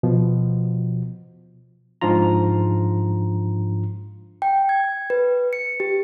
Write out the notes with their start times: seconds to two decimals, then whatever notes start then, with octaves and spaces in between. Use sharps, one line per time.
0.03 B2 F3
2.01 G#2 F3 D4 F4 A#5
4.42 G5
4.69 G#6
5.10 B4
5.53 C#7
5.80 G4